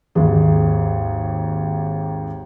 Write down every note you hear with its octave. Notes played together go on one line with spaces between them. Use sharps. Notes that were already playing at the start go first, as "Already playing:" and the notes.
G#1 D#2 G#4